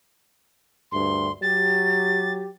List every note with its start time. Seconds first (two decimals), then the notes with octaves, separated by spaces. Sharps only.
0.92 D2 G2 C6
1.42 F#3 G4 A6